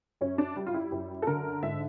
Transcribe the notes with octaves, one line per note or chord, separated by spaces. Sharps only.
F#2 C#4
D4
G3
F4
E4
F#2 E4
A4
D3 A#4
G#2 E5